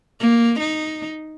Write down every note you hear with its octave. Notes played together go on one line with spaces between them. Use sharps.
A#3
D#4